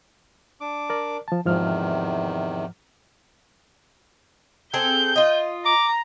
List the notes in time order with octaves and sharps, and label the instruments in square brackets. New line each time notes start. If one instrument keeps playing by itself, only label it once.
[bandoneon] D4 D6
[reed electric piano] A#4 D5
F3 A5
[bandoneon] E2 C3 D#3 [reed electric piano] G#2 F3 F6
[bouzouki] C4 G#4 A4 [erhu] G6
[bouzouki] F4 D#5
[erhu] A#5 [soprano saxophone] D6